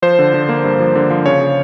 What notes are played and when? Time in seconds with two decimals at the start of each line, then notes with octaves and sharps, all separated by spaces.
0.02 F3 C5
0.19 D3
0.34 D3
0.49 A#3
0.64 G2
0.80 F3
0.95 D3
1.10 F3
1.25 C#3 C#5
1.41 C#3